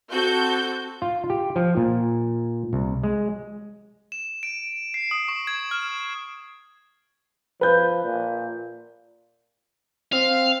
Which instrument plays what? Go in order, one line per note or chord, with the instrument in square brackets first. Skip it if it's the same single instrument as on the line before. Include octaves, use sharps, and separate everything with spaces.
[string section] C4 F#4 A4 G6
[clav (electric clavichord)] F4
G4
F3
A#2
C2
G#3
[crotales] E7
D7
C7
D#6
C#6
G#6
F6
[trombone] F3 [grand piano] B4 G6
[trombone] A#2
[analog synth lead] C4 [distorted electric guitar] F5